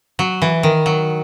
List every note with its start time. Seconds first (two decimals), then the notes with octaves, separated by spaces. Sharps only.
0.19 F#3
0.42 E3
0.63 D#3
0.86 F#3